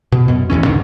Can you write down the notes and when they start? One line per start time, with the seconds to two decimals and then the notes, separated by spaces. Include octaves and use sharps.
0.12 B2
0.28 F#2 B2
0.50 A1 E2 E3 C#4
0.64 C2 G#2 D3 D#3